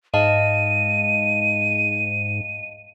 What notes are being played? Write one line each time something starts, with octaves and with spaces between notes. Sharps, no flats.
G#2 D#5 F5 A5 D#7